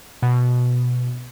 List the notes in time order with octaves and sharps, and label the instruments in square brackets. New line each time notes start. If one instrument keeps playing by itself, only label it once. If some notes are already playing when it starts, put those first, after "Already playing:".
[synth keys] B2